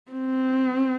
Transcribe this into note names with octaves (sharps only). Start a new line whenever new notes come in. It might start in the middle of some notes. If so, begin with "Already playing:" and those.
C4